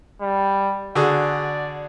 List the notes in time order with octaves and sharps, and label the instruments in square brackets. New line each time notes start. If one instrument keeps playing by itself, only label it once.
[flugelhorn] G3
[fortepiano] D3 F#4 G#4 [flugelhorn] D5